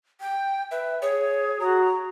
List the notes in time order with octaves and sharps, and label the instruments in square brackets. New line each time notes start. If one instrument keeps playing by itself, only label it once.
[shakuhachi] G5
[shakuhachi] B4 [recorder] E5
[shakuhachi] G#4 [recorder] C#5
[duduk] F#4 [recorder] A#5